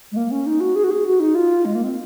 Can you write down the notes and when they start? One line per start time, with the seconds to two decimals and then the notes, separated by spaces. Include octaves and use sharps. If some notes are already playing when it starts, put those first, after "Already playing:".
0.12 G#3
0.17 A#3
0.31 C#4
0.46 D#4
0.60 F#4
0.76 G#4
0.84 F#4
0.91 G#4
1.05 F#4
1.20 D#4
1.35 F4
1.65 G#3
1.75 A#3
1.84 C4